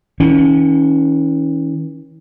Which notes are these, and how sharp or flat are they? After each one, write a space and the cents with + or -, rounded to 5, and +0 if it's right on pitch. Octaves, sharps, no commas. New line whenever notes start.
E3 -45 C#4 +0